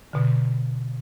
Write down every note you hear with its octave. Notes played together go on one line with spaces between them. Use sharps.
B2 D3